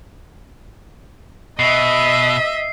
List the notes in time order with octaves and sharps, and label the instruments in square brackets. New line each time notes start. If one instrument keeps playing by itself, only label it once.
[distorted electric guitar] B2 [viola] D#5 E5 [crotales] C7